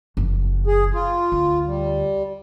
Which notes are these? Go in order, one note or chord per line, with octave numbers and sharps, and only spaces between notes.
F#1 F3
G#4
F4
D2
G3